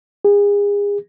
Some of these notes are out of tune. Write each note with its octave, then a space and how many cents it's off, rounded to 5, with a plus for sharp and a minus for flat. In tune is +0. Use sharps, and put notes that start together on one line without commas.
G#4 -35